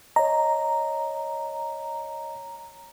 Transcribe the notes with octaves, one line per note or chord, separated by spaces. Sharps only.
C#5 D#5 A#5